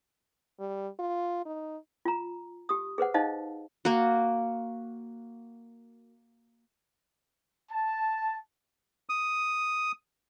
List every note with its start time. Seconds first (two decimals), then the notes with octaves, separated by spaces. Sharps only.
0.60 G3
0.99 F4
1.46 D#4
2.05 F4 A#5
2.69 G4 D#6
2.98 G#4 B4 C5 F#5
3.14 D#4 C5 D#5 F5 A5
3.85 A#3 F#4
7.71 A5
9.09 D#6